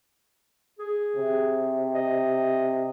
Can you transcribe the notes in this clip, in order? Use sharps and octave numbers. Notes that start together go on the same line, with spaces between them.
G#4
C3
D#5